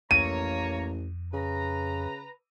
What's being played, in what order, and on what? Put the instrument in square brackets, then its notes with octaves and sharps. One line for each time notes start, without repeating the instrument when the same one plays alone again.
[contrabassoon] A1 [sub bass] F2 [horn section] A#3 C#5 A#5 [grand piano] D#7
[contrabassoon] C#3 [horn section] B4 A#5